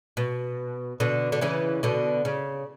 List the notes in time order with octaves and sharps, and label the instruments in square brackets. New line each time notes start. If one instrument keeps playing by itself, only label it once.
[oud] B2
B2 D3
D3
C#3 E3
B2 D3
C#3